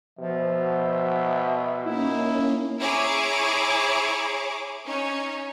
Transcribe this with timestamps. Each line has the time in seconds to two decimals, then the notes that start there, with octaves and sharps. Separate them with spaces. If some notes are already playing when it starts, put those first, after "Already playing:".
0.19 B2 F3 E5
1.85 A#3 C#4 D#4 E4
2.80 E4 G#4 C#5 A#5 D6
4.86 C#4 D#4 C#5